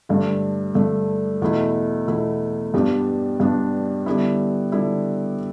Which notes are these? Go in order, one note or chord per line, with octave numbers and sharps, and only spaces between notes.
G2 D3 A3
G2 D3 A3
E2 B2 A3 E4
E2 B2 A3 E4
G2 G3 B3 D4
G2 G3 B3 D4
D3 G3 B3 E4
D3 G3 B3 E4